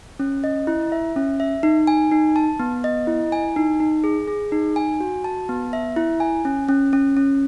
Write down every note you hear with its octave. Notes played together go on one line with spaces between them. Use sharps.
C#4
D#5
E4
E5
C#4
E5
D#4
G#5
D#4
A5
B3
D#5
E4
G#5
D#4
D#4
G#4
G#4
D#4
G#5
F#4
A5
B3
E5
E4
G#5
C#4
C#4
C#4
C#4